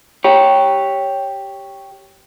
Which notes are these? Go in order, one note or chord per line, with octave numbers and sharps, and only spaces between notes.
G4 C#5